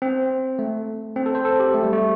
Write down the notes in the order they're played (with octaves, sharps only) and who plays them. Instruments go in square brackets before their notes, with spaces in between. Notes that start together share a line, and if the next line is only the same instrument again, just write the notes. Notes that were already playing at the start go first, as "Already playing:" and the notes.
[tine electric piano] C4
A3
C4
A4
C5
A4
G4
A3
G3
A3